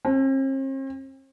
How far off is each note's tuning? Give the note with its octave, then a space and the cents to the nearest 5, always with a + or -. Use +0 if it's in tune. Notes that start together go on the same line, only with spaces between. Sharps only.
C4 +45